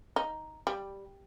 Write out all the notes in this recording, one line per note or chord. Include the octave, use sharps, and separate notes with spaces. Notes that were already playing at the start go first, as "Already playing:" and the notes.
D#4
G3